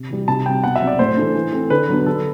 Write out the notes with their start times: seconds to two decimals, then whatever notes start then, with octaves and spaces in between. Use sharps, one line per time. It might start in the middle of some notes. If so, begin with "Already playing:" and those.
Already playing: C3
0.09 E3 G3
0.28 C3 A5
0.46 G3 C4 G5
0.63 B2 F#5
0.76 E5
0.81 F#3 C4
0.87 D5
0.99 A2 C5
1.17 E3 A3 D4
1.35 E3
1.52 A3 C4
1.70 D3 B4
1.89 F#3 B3 D4
2.06 D3 A4